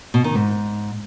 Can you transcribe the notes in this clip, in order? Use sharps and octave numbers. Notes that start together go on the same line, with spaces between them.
B2
D#3
G#2